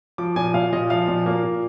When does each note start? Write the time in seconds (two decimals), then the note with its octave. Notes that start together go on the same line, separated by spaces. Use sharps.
0.18 F3 D6
0.36 A#2 G#5
0.54 A#2 F5
0.73 A#2 D#5
0.90 F3 F5
1.08 A#2
1.26 A#3
1.44 A#2